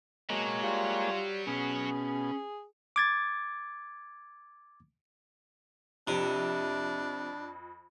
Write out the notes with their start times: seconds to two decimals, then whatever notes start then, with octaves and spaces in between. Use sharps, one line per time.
0.30 F#3 G#3 A#3 F#4 C#5 D#5
0.63 F4 G4 D5
1.47 B2 C#4 G#4
2.96 D6 G#6 A6
6.08 F2 C3 D4